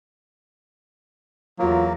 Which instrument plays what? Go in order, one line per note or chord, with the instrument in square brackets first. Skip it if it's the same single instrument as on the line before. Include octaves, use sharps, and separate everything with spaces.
[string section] E2 [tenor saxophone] F#3 [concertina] A#3 [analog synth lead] F4